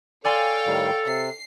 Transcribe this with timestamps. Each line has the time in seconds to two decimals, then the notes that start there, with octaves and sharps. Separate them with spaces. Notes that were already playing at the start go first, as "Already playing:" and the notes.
0.25 A4 C#5 D5 F5 G5 G#5 C6
0.67 A2 D#3 G3
1.06 C3 C7